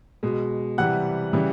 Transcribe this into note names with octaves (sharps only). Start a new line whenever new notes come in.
B2 G#3
C3 E3 G3 F#5 F#6
C#3 E3 G3